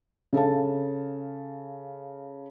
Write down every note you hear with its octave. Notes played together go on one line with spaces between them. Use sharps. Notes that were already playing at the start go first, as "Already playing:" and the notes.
C#3 A4 F5 A5